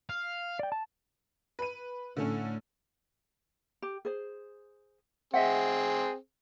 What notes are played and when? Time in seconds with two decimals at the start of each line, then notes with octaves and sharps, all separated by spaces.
0.10 F5
0.59 D5 G5
0.72 A5
1.59 B4 D#7
2.17 A2 D3 A3 C#4
3.82 G4
4.05 G#4 C5
5.34 C4 G#4 D#5 E5 F#5